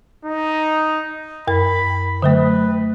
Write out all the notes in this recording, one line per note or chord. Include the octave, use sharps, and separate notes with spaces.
D#4
F#2 A#4 B5
D3 F#3 A3 B4